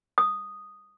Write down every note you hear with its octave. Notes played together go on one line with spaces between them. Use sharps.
D#6